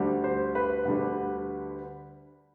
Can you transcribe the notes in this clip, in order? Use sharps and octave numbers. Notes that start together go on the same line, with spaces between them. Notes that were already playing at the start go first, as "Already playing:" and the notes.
Already playing: D2 D3 G3
C5
B4
D2 D3 G3